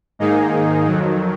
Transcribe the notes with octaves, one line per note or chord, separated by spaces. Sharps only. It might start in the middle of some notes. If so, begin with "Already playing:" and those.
G#2 D#3 A#3 D#4 G#4
F2 D#3 F#3